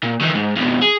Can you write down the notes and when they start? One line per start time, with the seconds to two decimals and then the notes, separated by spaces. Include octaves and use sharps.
0.03 A#2
0.21 D#3 E3
0.35 G#2
0.56 F2 B2
0.82 G#4